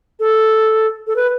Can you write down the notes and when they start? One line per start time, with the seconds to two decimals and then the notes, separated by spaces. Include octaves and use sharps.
0.20 A4
1.07 A4
1.16 B4